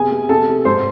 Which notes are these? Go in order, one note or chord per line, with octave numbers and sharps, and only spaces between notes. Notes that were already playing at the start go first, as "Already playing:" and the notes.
Already playing: C3 B3 G#4 G#5
B3
C3 A4 A5
C3
G#2 C5 C6